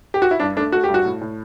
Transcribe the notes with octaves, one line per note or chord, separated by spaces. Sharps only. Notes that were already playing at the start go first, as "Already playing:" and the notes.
G4
F#4
E4
G2 D4
A3 D4
A3 F#4
G2 G4
F#4
A2
A2